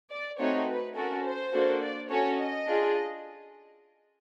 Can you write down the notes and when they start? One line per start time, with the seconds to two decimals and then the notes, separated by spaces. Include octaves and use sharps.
0.10 D5
0.38 A3 C4 D#4 F#4 C#5
0.67 B4
0.95 C#4 F#4 A4 A#4
1.24 C5
1.52 A#3 D4 F#4 A4
1.81 D5
2.09 C#4 F#4 A4 C#5
2.37 D#5
2.66 D4 F4 G#4